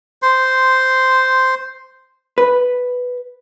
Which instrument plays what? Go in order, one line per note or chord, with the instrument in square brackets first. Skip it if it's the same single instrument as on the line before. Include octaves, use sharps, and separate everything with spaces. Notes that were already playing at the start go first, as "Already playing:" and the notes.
[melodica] C5 C6
[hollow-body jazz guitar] B4